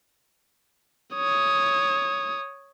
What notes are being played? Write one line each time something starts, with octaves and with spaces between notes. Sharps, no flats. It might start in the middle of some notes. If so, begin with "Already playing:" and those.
C#5 D#6